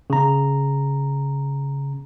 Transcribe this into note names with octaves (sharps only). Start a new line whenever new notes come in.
C#3 A#5